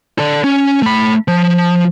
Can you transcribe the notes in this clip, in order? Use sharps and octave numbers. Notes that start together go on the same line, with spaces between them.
A4 D5
C#4
A3 B5
F3